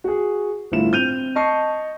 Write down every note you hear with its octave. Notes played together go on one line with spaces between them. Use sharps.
F#4 G#4
G1 A2 E4 F4 E7
C4 G6 D#7 F7
D#5 A5 C#6 C7